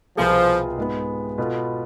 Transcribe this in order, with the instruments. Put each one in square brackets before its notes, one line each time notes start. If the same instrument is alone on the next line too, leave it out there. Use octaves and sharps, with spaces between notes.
[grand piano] C2 B2 B3 F4 G#4 [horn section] F3
[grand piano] G#2 G#3 B3
B2 B3 F4 A4